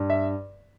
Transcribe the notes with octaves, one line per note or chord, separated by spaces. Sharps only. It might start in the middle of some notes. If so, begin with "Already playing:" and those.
Already playing: G2
E5